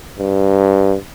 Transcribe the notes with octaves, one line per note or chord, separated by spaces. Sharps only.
G2